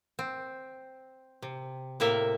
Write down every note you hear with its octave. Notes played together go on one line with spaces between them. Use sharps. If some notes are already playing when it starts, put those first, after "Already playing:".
C4
C3
A2 C3 A#3 A#4 E5